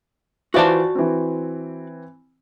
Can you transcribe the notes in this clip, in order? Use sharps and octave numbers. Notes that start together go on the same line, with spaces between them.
E3 F4 F#4 C5 D5 A5
E3 C4